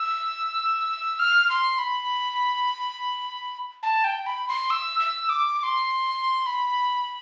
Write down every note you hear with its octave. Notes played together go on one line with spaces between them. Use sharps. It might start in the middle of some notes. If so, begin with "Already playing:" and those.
Already playing: E6
F6
C6
B5
A5
G5
B5
C6
E6
E6
D6
D6
C6
B5